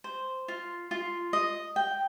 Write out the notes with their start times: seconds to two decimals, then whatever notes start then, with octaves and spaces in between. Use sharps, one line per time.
0.04 C5
0.48 F4
0.91 F4
1.33 D#5
1.76 G5